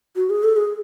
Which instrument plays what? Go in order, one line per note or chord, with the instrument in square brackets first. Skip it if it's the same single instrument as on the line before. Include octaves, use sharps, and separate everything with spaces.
[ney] F#4
G#4
A4
G#4